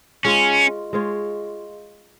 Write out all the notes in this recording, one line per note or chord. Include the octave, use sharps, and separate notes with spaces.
G#3 C#4 F4 C#5
G#3 F4 C#5